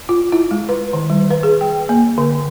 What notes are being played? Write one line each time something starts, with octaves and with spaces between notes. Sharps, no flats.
F4
E4
G#3
B4
D#3
G3
B4
G#4
G5
A#3
D3